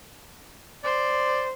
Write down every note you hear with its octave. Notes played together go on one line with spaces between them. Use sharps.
C5 D5